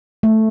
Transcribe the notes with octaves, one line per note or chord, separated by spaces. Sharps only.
A3